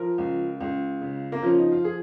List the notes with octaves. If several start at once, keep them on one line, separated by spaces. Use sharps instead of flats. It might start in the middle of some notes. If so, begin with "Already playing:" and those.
Already playing: F3 A#4
C#2
C#2
C#3
A#3
F3 C#4
D#4
F4
G#4